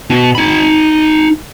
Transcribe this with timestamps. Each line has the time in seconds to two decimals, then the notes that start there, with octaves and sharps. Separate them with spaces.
0.10 B2
0.35 D#4 B5